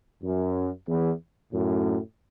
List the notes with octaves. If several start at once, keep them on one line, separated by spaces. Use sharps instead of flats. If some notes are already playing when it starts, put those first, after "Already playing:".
F#2
E2
F#2 A2